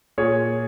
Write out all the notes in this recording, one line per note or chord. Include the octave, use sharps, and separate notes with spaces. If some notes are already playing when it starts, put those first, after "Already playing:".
A#2 G#4 C#5